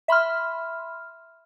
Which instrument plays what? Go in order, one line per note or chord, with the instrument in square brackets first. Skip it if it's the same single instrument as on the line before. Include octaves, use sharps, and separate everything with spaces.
[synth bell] E5 B5 C6 F6